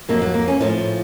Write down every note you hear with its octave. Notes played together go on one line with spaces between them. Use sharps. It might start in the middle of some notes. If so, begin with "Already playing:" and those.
F2 D#3 F#3 A#3
F#3
A#3
C#4
A2 F3 F4